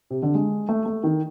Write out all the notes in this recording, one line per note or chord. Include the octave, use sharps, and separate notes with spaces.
C3
D3
G#3
A3
A3
D#3